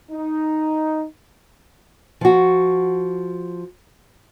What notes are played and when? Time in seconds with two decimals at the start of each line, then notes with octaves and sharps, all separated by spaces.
0.11 D#4
2.21 F3 F#4